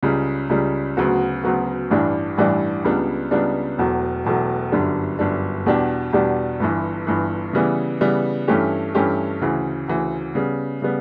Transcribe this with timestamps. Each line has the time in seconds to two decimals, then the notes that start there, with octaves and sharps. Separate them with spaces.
0.03 C#2 C#3 G3
0.49 C#2 C#3 G3
0.97 D2 C#3 F#3 B3 F#4
1.43 D2 C#3 F#3 B3 F#4
1.91 A1 G2 E3 G3 D4
2.37 A1 G2 E3 G3 D4
2.84 C#2 C#3 G3 B3 D4
3.31 C#2 C#3 G3 B3 D4
3.78 E1 E2 B2 F#3 A3
4.25 E1 E2 B2 F#3 A3
4.72 G1 F#2 D3 G3 D4
5.19 G1 F#2 D3 G3 D4
5.66 E2 B2 G3 D4 G4
6.13 E2 B2 G3 D4 G4
6.60 G1 G2 E3
7.07 G1 G2 E3
7.53 C#3 E3 G3 B3
8.01 C#3 E3 G3 B3
8.48 G2 E3 A3 C#4 G4
8.95 G2 E3 A3 C#4 G4
9.41 D2 C#3 E3
9.88 D2 C#3 E3
10.35 C#3 G3 B3
10.82 C#3 G3 B3